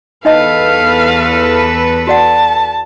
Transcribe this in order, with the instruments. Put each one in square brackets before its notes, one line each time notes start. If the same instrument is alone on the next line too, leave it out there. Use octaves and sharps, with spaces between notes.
[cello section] E2 A4 B4 [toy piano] D#4 D#5 A5 [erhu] F5
[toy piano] F#4 D5 F#5 [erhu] A5